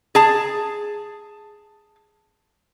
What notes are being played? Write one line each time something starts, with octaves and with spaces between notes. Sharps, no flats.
G#4 A5